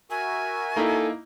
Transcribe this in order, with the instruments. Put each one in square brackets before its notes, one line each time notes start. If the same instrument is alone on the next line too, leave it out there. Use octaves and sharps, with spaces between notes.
[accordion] F#4 A#4 E5 [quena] G#5
[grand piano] A#3 D#4 E4 [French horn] A4